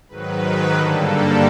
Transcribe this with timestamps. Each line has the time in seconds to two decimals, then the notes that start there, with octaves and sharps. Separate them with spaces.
0.09 G#2 D#3 F#3 B4
0.73 G2 D3 G3 A#3 A4